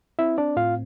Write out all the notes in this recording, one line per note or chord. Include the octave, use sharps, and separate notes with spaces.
C4 E4 E5
D4 D5
A2 F4 F5